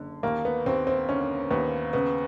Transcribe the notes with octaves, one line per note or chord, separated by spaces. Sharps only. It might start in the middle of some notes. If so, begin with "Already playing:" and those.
Already playing: F#1 D3
D#2 A#3
B3
D#2 C4
C4
D3 C#4
D#2 B3
C#3 B3